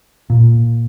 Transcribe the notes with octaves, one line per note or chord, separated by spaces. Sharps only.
A#2